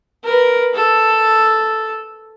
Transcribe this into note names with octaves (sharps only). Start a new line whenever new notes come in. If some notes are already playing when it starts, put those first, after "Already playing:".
A#4 B4
A4